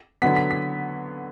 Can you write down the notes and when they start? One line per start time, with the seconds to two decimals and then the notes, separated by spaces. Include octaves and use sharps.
0.22 D3 F#3 B3 B6
0.36 B6
0.51 B6